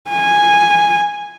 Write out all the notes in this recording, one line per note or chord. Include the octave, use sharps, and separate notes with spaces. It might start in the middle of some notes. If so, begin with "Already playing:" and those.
G#5